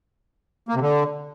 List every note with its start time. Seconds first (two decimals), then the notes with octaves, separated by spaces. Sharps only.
0.69 A#3
0.75 C3
0.81 D3